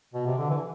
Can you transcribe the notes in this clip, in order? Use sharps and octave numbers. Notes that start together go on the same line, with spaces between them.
B2
C3
D3
E3